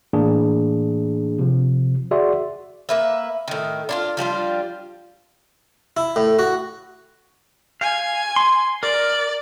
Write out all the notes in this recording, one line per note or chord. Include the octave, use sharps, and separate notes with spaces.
A2 E3 A#3 D4 G#4
C3 F3
F#4 G#4 D5 E5 C6
A#3 B4 E5
A2 D#3
D4 E4 F4
F3 G3 D4 F4
E4
A2
F#4
F5 G#5
C6
A#4 D5